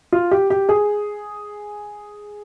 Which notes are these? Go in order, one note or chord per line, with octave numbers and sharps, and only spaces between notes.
F4
G4
G4
G#4